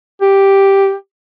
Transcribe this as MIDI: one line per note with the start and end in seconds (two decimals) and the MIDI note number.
0.21 0.93 67